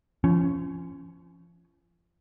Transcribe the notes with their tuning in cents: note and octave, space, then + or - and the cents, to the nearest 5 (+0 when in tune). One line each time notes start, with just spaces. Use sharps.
F3 -30 C#4 +0